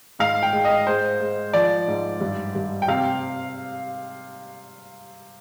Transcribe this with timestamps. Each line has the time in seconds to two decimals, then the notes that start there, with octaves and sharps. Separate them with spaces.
0.19 G#2 F5
0.43 G5
0.53 G#3
0.65 D#5
0.87 G#3 C5
1.20 G#3
1.53 F3 D5
1.87 G#2
2.21 G2
2.55 G2
2.82 G5
2.88 C3 F5